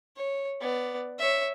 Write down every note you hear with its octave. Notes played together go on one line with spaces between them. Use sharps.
C#5
B3 D5
C#5 E5